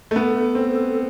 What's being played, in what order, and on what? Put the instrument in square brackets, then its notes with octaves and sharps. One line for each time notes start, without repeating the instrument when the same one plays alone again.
[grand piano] A3
[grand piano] B3 [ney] A4
[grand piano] C4